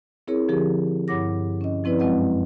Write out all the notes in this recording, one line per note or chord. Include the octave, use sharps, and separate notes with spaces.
C4 E4 G#4 A#4 C#5
D3 F3 G4 G#4 A#4
G2 E4 C#5 F#5 D6 A#6
C#4 D#5
F3 C4 E4 B4 D5
F#2 F#3 G#3 C4 D#5 F#5